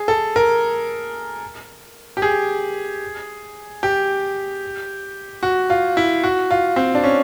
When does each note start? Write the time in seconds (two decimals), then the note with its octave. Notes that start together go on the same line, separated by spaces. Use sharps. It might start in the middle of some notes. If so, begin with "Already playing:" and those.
Already playing: G#4
0.08 A4
0.36 A#4
2.17 G4
2.22 G#4
3.83 G4
5.43 F#4
5.70 F4
5.97 E4
6.23 F#4
6.50 F4
6.76 C4
6.95 D4
7.04 C#4